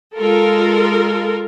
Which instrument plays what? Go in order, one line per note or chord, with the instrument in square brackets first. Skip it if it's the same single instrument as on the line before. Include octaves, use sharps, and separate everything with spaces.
[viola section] G#3 F4 A4 A#4